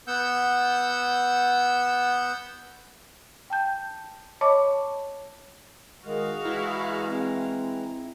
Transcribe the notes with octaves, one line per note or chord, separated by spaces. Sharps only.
B3 F#5 E6 G6
G5 A5 G6
C#5 D#5 A5 B5 C#6 D6
D#3 G#3 F#4 G#4 F5
E3 G#3 E4 A#5
C4